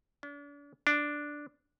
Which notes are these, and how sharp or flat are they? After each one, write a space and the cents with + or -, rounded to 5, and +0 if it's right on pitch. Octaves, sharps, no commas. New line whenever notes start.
D4 -40
D4 +0